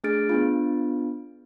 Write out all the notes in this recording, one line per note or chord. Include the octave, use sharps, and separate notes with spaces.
A3 D4 G#4 F6 A6 D7
B3 D4 F4